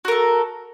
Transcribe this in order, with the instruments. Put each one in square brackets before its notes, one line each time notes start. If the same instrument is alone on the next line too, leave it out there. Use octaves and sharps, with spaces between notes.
[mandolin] F#4
A#4
A4